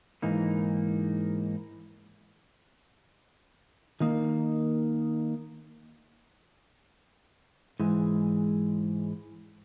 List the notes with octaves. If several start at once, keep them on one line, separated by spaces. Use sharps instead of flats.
G#2 E3 A#3 D#4
D#3 A#3 D#4
G#2 E3 G#3